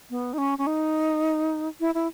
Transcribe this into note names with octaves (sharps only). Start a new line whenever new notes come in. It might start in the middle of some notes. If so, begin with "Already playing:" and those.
B3
D#4
C#4
C#4
D#4
E4
E4